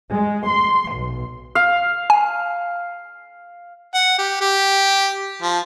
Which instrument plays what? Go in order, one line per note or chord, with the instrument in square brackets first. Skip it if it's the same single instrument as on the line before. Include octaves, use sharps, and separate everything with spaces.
[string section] G#3
C6
B1
[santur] F5
[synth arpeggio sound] G#5
[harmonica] F#5
G4
G4
F3